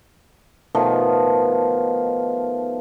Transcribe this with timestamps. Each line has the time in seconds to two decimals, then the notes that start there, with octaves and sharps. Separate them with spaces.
0.75 B2 D#3 F3 A3